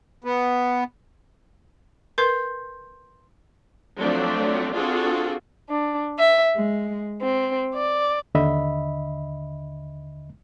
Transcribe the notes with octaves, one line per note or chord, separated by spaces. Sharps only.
B3
A#4 B4 C6 G6 C7
F3 F#3 A3 C4 D4 D5
C4 D4 F4 F#4 G#4 A4
D4
E5
G#3
C4
D5
D#2 D3 D#5 E5 B5